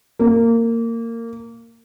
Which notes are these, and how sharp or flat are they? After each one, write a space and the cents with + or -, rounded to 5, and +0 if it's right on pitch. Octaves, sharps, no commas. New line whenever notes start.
A#3 -20